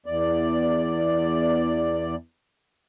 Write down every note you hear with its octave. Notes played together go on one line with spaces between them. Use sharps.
E2 D5